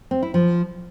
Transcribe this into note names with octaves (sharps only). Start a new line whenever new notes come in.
C4
E4
F3